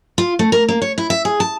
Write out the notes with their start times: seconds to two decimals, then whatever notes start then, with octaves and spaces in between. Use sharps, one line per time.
0.18 F4
0.39 A3
0.52 A#4
0.69 A#3
0.82 C#5
0.98 E4
1.10 E5
1.25 G#4
1.40 A5